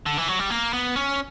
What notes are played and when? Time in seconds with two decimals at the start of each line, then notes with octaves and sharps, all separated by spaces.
0.06 D3
0.17 E3
0.28 F#3
0.39 G3
0.50 A#3
0.73 B3
0.96 C#4